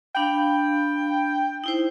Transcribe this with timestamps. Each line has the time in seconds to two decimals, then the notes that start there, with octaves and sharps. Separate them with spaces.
0.15 D4 F5 G5 B5
1.64 D#4 E4 C5